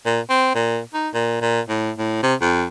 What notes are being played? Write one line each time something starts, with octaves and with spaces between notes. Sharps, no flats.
A#2
C4
A#2
D#4
A#2
A#2
A2
A2
C3
F2